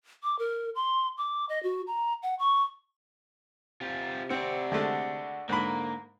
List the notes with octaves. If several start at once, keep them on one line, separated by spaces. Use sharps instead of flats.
D6
A#4
C6
D6
D#5
F#4
A#5
F#5
C#6
C3 F4 G4
C4 F#4 D5
D3 G#3 A3
G#2 D3 A#3 B5